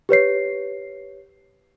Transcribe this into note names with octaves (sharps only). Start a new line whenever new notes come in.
G4 B4 C#5 C7